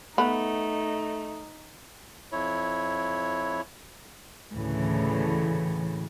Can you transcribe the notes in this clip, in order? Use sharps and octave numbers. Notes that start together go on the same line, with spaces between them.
A3 B3 D#4 B5
F2 E4 C#5
D2 A2 C#3 E3